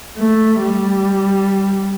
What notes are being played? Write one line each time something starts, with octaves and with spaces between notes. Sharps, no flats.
A3
G3